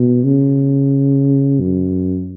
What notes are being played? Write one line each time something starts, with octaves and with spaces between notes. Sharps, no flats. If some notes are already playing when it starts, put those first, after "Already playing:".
Already playing: B2
C#3
F#2